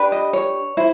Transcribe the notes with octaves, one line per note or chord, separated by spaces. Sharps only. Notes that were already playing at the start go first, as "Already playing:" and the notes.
Already playing: D4 G4 B4
D#5
C#5
E4 C5